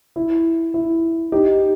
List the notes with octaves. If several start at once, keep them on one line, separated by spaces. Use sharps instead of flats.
E4
E4
D#4 G4